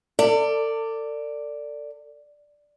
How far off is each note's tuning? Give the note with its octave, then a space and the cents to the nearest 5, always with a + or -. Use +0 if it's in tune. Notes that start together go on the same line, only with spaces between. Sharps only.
A4 +40 D5 +0